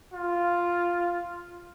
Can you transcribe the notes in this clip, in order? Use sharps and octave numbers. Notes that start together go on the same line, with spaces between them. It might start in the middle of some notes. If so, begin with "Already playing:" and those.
F4